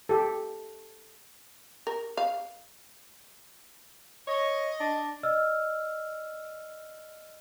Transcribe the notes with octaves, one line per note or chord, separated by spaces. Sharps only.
G4 A4
A#4
F5
C#5 D#5
D4
D5 D#5 E6 F6